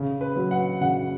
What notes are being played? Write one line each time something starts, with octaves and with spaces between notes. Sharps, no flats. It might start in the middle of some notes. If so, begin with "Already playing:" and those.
Already playing: C#3
B4
F#3
F#5
C#3 F#5